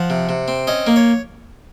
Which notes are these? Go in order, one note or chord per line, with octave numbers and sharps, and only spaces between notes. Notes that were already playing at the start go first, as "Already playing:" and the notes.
Already playing: F3 F#5
C3
C3
C4
C#4 D#5
A#3
C#5